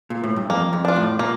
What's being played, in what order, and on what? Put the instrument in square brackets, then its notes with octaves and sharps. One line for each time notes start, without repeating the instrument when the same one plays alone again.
[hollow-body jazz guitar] A#2
A2
G2
[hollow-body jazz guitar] F2 [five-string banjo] A#3
[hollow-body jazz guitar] F2
[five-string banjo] D4 F4
[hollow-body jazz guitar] A2
[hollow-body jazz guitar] A#2 [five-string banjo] A#3